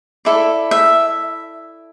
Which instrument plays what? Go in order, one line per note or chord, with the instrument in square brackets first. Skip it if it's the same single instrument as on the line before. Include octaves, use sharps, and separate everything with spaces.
[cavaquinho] E4 A4 D5
E5